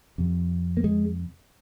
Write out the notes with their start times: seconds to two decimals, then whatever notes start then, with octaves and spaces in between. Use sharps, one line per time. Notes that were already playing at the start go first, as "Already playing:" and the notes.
0.18 F2 C3
0.77 A#3
0.84 G#3